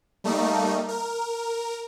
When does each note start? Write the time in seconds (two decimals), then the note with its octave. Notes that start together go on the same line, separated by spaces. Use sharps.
0.24 G3 A3 A#3 D#4
0.88 A#4